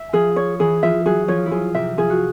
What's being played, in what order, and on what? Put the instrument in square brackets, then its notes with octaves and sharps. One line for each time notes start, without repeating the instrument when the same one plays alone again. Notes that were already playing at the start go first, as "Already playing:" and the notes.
Already playing: [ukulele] E5
[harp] F3 F4 [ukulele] G#4
[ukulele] C#5
[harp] E3 E4 [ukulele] G#4
[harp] F3 F4 [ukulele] E5
[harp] F#3 F#4 [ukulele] G#4
[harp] F3 F4 [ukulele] C#5
[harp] E4
[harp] F3 F4 [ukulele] G#4
[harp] C3 C4 [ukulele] E5
[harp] F3 F4 [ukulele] G#4
[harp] F#4